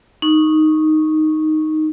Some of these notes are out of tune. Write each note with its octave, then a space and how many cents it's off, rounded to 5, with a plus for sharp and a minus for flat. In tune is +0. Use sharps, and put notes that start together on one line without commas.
D#4 +0 C#6 -10